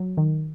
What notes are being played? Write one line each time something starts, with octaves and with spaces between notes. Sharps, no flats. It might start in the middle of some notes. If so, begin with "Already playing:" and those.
Already playing: F#3
D#3